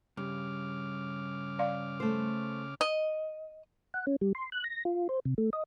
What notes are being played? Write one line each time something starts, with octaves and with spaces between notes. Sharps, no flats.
G2 C#3 D6 F6
D5 F5
A3 C5
D#5
F#5
C#4
G3
C6
F#6
A#6
F4
C5
C3
A3
D#5